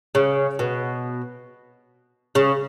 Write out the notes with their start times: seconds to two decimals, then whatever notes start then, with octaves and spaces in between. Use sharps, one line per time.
0.15 C#3
0.59 B2
2.35 C#3